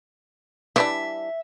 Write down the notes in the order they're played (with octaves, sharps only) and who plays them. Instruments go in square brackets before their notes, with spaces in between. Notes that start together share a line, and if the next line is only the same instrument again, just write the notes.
[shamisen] E3 G3 D4 [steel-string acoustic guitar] E5